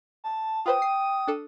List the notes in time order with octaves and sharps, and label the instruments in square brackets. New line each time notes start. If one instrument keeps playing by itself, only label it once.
[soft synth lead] A5
[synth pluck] F4 B4 C5 [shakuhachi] G5 [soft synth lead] D#6
[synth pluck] C7
D4 A4